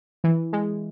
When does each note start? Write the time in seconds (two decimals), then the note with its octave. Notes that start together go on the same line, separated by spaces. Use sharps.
0.24 E3
0.53 G#3